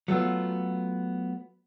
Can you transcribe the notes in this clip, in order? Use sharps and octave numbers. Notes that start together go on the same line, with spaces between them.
F#3 A3 B3 F4